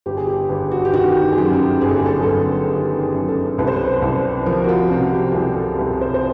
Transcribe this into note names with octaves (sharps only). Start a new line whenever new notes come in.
G1 G4
G#4
G4
G1
F#4
G4
D#3 F#4
G#4
F#2 G4
G1 G#4
A4
G#4
A4
G#4
A4
G1 G#4
D#3 G4
G#4
F#2
A4
C2 B4
C5
B4
C2
F3 A#4
F#4
F4
C3 F#4
G4
C2 G#4
A4
C2 B4
C5
C5